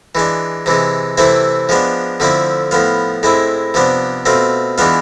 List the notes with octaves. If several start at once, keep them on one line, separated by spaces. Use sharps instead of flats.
E3 G#3 D4
C3 E3 G#3
C3 E3 A3 C4 E4
F3 G#3 B3 D4
D3 F3 A3 C4 E4
A2 F3 B3 F4
A2 G#3 C4 E4
C3 F3 B3 D4
B2 A3 C4 F4
E3 G#3 B3 D4 F4